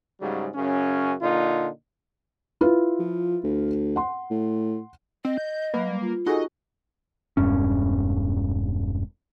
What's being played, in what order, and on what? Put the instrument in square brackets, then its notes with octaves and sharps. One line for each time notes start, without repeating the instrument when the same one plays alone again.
[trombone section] G#2 C#3 F#3 G3
F#2 C#3 C#4
A#2 D3 D#4 F4
[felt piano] E4 F4 B4
[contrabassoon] F3
D2
[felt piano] F#5 C6
[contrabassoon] A2
[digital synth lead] C4 [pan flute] D#5
[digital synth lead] G6
[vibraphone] F#3 [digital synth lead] A#3 [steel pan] B4
[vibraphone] G3
F4
[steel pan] D#4 F#4 G#4 [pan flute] A4 [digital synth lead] D#5
[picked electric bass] E1 G2 C#4